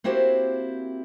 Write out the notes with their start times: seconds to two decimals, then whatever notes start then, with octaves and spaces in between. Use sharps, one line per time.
0.04 A#3 C4 E4 F#4 G4 C5